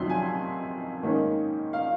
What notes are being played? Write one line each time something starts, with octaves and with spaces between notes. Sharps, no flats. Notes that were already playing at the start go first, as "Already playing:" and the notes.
Already playing: F2 C3 D#3 F#3 C#4 C6
G#5
G#2 D#3 A#3 C#4
F5